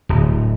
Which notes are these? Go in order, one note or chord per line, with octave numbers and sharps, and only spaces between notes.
D1